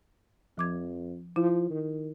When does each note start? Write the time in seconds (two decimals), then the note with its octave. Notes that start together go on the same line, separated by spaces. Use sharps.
0.58 F2 F3 D6 G#6
1.36 F3 E4
1.70 D#3